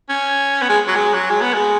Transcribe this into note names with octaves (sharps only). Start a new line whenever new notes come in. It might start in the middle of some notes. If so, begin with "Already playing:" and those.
C#4
B3
G#3
F#3
G#3
F#3
G#3
B3
G#3